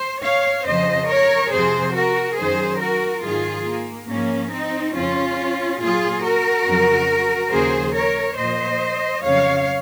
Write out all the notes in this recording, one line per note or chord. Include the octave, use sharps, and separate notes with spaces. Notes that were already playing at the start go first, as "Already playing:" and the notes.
Already playing: C5
C#5 F5
F2 C#3 F3 C5 D#5
A#4 C#5
F2 C3 F3 G#4 C5
F#4 A#4
F#2 D#3 F#3 G#4 C5
F#4 A#4
G#2 D#3 F#3 F4 G#4
A#3
G#2 F3 A#3 C#4
C4 D#4
F2 C#3 F3 C#4 F4
A#2 F#3 F4 G#4
F#4 A#4
F2 C#3 F#3
D#2 C#3 F3 G#4 C5
A#4 C#5
A#2 F3 C5 D#5
F2 C#3 F#3 C#5 F5